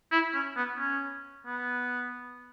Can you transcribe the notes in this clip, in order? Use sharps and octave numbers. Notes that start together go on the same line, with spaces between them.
E4
C#4
B3
C#4
B3